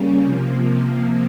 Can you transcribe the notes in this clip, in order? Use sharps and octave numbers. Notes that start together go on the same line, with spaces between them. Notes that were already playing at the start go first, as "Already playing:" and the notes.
Already playing: C#3 G3 A#3 C#4
C3 F3 A#3